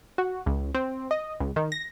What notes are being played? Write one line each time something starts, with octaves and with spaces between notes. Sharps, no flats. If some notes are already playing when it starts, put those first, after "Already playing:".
F#4
C#2
C4
D#5
C#2
D#3
A#6